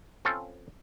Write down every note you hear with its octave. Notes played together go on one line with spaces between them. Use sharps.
C4 C#4 F4 A4